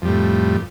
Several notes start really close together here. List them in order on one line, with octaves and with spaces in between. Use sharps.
F2 G3 A2